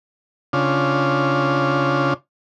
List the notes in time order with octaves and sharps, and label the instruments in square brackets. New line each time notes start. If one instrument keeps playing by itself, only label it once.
[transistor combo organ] C#3 D4 F4